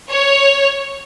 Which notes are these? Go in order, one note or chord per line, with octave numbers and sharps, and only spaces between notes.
C#5